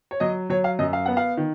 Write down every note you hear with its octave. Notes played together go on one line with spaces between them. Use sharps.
C#5
F#3 D#5
F#3 C#5
F5
F#2 D#5
F5
B3 F#5
F5
D#3